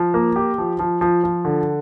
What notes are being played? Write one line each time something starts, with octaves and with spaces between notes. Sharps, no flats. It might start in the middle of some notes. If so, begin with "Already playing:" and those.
Already playing: F3
A#3
G4
F3
F3
F3
F3
D3